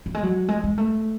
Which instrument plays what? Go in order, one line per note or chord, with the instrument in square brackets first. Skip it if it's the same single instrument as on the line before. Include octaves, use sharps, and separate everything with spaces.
[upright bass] F#3
G#3
F#3
G#3
G#3
A3